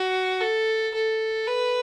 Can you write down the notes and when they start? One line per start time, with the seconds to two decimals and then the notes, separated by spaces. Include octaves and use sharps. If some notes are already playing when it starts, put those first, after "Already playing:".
Already playing: F#4
0.40 A4
0.94 A4
1.47 B4